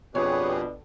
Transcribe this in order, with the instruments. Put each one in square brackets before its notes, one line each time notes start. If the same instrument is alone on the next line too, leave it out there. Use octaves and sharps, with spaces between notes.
[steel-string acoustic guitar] F2 [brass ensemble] B2 D4 [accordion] G4 G#4 B4 [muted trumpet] C#5